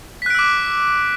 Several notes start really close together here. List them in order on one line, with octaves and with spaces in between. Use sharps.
B6 F#6 D7 E6 D6